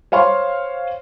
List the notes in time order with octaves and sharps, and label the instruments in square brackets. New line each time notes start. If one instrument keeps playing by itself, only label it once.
[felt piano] C5 C#5 F5 C6 C#6